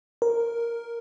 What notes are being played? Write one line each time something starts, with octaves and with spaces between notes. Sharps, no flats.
A#4